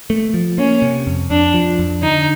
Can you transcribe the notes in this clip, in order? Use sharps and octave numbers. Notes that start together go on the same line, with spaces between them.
A3
F3
A#3 C#4
C3
F2
F2 D4
F3
F2
D3 D#4